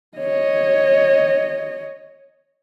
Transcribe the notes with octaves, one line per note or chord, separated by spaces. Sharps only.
C#5 D#5